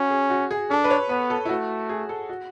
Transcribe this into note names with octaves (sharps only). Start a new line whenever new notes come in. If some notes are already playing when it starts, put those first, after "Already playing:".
Already playing: C#4 F#4
G#4
F#4
G#4
D4 A4
B4
C#5
B3 B4
A4
E4
A3 F#4
G#4
A4
F#4